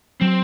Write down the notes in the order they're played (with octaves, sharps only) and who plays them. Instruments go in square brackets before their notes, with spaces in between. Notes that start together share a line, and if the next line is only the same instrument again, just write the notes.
[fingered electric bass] F#3 [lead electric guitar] C4